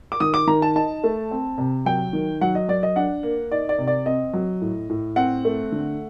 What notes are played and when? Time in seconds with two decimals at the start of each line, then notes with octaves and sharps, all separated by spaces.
0.12 D6
0.20 D#3 D#6
0.34 D6
0.47 D#3 A#5
0.62 A5
0.75 D#4 A5
1.04 A3
1.31 C4
1.58 C3
1.85 F#3 G5
2.13 D#3
2.41 F#3 F#5
2.55 D#5
2.68 F#3 D5
2.83 D#5
2.96 D4 F#5
3.23 A#3
3.51 D#4 D5
3.69 D5
3.78 C3
3.87 D5
4.06 C4 D#5
4.33 F#3
4.61 A2
4.90 A2
5.16 C4 F#5
5.45 A3
5.72 D3